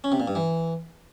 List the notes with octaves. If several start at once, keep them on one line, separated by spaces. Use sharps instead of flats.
C#4
C3
A#2
G2
E3